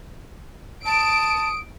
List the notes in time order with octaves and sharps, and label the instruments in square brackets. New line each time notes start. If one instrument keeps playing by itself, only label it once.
[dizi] A5 [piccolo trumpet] D#6 [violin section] D7